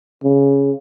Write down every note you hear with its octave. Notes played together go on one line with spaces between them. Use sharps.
C#3